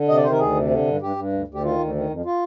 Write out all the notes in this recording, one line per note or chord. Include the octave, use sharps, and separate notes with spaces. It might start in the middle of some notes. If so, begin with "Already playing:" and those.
Already playing: D3
C3 D#5
D5
D#3 C5
A#4
D2 G#4
C3
D3
G2
G2 G4
G2
D2
D2
G4
D#3 F4
D2
D#3
F2
F4